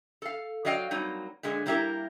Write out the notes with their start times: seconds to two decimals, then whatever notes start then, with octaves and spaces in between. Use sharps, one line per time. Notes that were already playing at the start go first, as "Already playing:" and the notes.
0.22 A4 F5
0.65 F#3 D5 D#5 F5 G5
0.91 F#3 G3 A#3 C4 D#4
1.43 A#2 D3 G#3
1.66 G3 A#3 D4 E4 G4 A#4